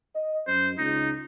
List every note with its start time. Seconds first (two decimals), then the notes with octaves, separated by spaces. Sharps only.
0.15 D#5
0.47 F#2 C5
0.78 C#2 D#4